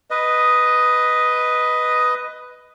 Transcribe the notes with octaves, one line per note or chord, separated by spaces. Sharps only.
B4 D#5